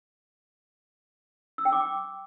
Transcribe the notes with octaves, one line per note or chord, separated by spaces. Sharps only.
E6
G5
D6